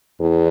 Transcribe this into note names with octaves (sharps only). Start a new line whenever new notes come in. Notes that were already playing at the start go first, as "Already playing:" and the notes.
E2